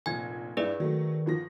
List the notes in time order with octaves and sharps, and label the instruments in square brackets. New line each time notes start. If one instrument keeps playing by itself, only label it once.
[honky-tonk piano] F1 A#1 G#6 [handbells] G#5
[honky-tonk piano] G2 E4 [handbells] G#4 B4 D5
[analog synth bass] D#3 [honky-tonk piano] F#3 A3
[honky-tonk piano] G1 F3 A#6